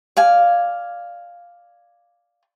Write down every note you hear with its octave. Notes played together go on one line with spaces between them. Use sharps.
D5 F5 G#5